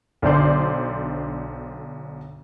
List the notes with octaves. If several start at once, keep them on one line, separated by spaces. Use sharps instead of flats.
B1 D3 C5 D5 C6